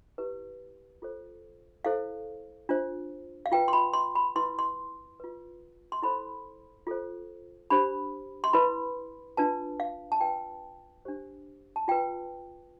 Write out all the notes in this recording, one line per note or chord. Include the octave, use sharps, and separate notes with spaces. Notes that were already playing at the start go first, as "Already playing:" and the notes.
E4 G4 B4
F4 A4 C5
E4 A4 C5 F5
D4 F4 C5
F5
F4 B4 G5
C6
B5
C6
B5
E4 B4 C6
C6
F4 B4
C6
E4 A4 C5 B5
F4 A4 C5
D4 G4 C5 B5
C6
E4 B4 B5
D4 F4 B4 A5
F5
A5
F4 B4 G5
D4 G4 C5
A5
F4 B4 G5